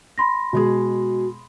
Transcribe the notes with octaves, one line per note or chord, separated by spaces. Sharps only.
B5 C6 A#6
B2 G#3 F#4 G#4